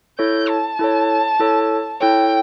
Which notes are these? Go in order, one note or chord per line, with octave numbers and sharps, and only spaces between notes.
E4 A4 C#5 G6
A5
E4 A4 C#5
E4 A4 C#5
E4 A4 C#5 G5